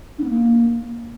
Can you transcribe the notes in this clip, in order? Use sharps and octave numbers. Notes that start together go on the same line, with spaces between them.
D4
B3
A#3